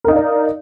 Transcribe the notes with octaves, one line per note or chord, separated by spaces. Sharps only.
D#4 A#4 D5 F5